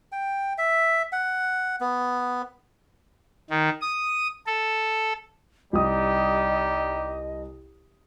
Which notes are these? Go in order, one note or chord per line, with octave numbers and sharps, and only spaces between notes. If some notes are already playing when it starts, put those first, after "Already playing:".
G5
E5
F#5
B3
D#3
D#6
A4
C2 G3 D#4 G4 D#5 D#6